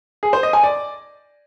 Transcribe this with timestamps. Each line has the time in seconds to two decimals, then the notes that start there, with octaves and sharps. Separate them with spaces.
0.23 G#4
0.33 C5
0.43 D#5
0.53 G#5
0.64 D5